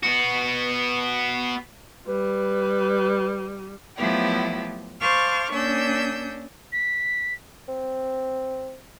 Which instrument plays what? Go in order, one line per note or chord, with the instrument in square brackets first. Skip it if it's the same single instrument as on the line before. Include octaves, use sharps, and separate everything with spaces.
[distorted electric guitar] B3 F#4
[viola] G3 [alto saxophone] B4
[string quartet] F3 F#3 A3 B3 E4 G4
C5 F5 A5 C#6 D6 F6
A#3 C#4 D4 E6 G6
[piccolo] B6
[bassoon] C4